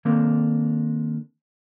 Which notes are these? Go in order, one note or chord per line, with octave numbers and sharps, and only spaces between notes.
D#3 A#3 C4 D4 A4 A#4